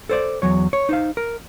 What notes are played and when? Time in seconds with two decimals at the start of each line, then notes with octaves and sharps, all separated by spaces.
0.09 A4 C5 D5
0.42 E2 F#3 C#5
0.73 C#5
0.89 D#4 C5 F5
1.17 A#4